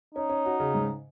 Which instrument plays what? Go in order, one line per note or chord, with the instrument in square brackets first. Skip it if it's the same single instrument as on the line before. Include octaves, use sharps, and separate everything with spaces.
[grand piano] C#4 [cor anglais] D#4
[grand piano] C#4
F#4
C#3
G#2